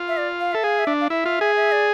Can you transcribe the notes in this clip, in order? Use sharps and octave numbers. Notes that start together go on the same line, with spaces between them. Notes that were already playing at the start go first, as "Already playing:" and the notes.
Already playing: F4
E5
D5
F5
A4 E5
G#4 F5
E5
D4
F5
E4 E5
F4
G#4
E5
D5